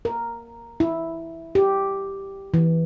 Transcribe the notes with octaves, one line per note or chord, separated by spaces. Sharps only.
A#4
E4
G4
E3